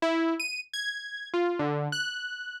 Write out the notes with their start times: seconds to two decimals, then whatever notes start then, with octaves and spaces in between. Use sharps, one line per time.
0.02 E4
0.40 D#7
0.73 G#6
1.34 F4
1.59 D3
1.92 F#6